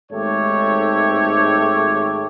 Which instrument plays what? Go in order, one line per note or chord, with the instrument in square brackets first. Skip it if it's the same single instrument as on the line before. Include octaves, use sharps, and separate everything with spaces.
[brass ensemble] G#1 G#2 A3 G4 A4 C#5